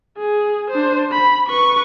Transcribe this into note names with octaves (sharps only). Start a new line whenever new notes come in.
G#4
D4 C5
B5
B4 C#6